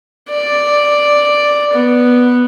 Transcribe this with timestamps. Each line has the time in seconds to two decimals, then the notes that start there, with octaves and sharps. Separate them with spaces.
0.30 D5
1.74 B3